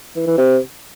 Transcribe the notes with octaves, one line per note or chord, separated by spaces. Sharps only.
E3
E3
C3